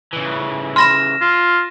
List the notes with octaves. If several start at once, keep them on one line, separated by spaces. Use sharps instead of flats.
C#3 E3
B5 C6 F6 A#6 E7
F4